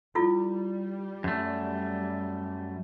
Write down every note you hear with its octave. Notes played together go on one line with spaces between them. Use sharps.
G3 E4 F4 A4
F#2 A3